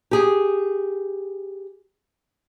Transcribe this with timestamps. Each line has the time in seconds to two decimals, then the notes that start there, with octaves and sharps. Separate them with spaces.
0.11 G4 G#4